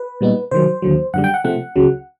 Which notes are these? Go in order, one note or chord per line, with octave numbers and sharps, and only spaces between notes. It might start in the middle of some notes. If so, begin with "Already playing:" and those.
Already playing: B4
A#2 G3 B3 D#4
C3 D#3 F#3 C5
D#2 D3 F#3
F#2 D3 G3 F#5
G5
F#5
C3 F3 A3 C4 F#5
C#2 C#3 F#3